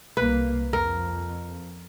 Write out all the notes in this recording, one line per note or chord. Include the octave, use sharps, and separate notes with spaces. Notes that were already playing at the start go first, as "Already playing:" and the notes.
C2 A#3 B4
F2 A#4